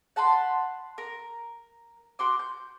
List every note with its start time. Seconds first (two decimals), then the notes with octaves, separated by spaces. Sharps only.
0.16 F#5 A5 B5 C6
0.98 A#4
2.19 F#4 C6 D6
2.39 G6